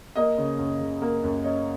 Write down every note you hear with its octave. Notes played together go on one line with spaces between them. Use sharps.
A#3 D#5
C#3
F#2
C#3
A#3
F#2
C#4 D#5